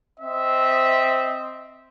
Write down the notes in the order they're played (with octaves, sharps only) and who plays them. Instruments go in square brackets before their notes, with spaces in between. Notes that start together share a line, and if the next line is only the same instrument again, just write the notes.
[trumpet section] C4 D#5 E5